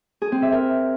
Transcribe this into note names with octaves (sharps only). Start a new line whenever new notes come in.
G#4
C4
E5
A#4